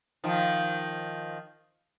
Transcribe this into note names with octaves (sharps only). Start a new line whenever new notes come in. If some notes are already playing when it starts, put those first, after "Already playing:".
D#3 F3